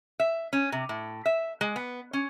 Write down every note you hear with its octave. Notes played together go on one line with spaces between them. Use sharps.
E5
C#4
C3
A2
E5
G#3
B3
C#4